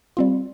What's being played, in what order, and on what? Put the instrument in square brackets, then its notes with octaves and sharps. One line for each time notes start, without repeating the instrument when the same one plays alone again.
[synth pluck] G3 C4 F4